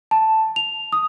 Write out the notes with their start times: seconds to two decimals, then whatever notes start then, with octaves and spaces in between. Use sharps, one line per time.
0.11 A5
0.56 F7
0.93 D#6